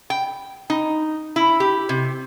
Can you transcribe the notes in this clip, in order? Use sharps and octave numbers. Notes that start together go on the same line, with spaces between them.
G5
D#4
E4
G4
C3